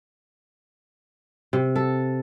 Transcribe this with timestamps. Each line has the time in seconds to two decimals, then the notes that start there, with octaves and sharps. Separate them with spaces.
1.53 C3
1.76 A4